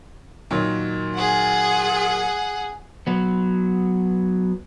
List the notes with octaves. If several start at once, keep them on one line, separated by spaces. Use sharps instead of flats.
A#2 D#3 F#3
G#4 F#5
F#3 B3